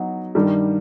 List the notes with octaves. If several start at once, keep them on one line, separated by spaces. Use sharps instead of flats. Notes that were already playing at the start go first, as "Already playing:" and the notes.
Already playing: F#3 B3 D#4 F#4
G2 D#3 G3